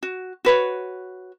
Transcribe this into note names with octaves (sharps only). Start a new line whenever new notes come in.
F#4
F#4 B4 C#5